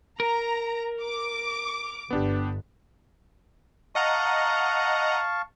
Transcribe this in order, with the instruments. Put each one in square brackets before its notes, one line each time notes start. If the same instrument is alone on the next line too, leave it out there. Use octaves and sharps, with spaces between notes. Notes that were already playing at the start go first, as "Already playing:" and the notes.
[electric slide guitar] A#4 [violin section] A#5
[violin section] D6
[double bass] G1 [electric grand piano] B3 D4 G4
[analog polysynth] D#5 F#5 A#5 [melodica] F5 A5 C#6